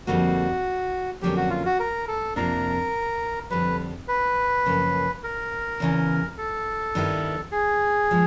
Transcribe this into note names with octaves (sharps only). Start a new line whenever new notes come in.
F2 D3 G3 A#3 D#4 F#4
F2 D3 F#3 A#3 C#4 G4
F#4
F4
F#4
A#4
A4
F2 C3 F3 A#3 D4 A#4
F2 D3 G3 B4
B4
F#2 C#3 F3 A#3
A#4
E2 C#3 E3
A4
G2 D#3 G3 B3 E4
G#4
F3 G#3